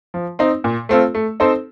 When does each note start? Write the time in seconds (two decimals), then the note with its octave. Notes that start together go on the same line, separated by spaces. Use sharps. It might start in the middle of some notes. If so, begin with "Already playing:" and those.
0.14 F3
0.39 C4 D#4
0.64 A#2
0.89 A3 C4 F4 A4
1.15 A3
1.40 C4 D#4 A4 C5